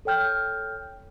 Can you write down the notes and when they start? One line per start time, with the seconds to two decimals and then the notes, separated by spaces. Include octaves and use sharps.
0.05 A4 C#5 G5 F6 G6